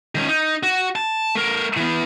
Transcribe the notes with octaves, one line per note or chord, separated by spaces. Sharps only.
D#3 C#4
D#4
F#4
A5
A3 A#4
E3 B3